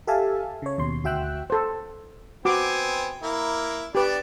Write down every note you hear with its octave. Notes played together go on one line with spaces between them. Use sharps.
G4 A4 E5 F5 G#5 A5
C#3 C#5
D#2 B2 C6
D2 F#4 E5 G5 E6 F#6
A4 C5
B3 C4 F#4 G#5 D6
A#3 E4
B3 D4 G4 B4 D5